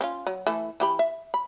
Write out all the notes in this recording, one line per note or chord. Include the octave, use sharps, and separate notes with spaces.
C4 C#4 F4
F#3
E3 A3 A4
E3 G4 B5
E5
B5